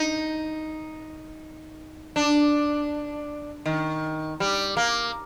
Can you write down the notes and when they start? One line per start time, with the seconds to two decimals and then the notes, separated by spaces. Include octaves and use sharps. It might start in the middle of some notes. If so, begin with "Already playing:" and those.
Already playing: D#4
2.16 D4
3.66 D#3
4.40 G3
4.77 A#3